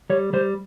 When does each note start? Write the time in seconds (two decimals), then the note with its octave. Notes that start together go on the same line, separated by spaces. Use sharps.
0.10 G3 C#5
0.33 G3 C5